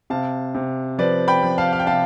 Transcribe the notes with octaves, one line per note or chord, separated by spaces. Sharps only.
C3 F5 A5
C3
F3 B4 D5
G5 B5
F3
F5 A5
F5
G5
C3 F5 A5